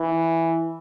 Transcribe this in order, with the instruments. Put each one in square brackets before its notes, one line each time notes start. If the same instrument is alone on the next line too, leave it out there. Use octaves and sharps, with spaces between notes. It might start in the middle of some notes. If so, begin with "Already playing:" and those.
Already playing: [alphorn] E3